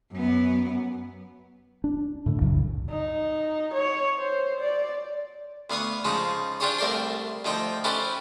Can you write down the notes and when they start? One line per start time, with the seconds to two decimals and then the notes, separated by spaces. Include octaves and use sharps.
0.13 F#2 B3
1.84 D4
2.26 A2 D3
2.42 C2 F#2 C#3 F#3
2.90 D#4
3.74 C#5
4.19 C5
4.61 D5
5.70 D2 B3 F5 C#6 D#6
6.05 C#3 F3 G#3 D#4
6.60 D4 F4 G4 G#4 C5 C#5
6.78 C2 A3 A#4 D5 G5 C6
7.45 D2 F3 D#4 G5
7.84 C#4 E4 G4 A4 B4 C5